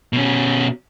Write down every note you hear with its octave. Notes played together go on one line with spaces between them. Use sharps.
B2 C#4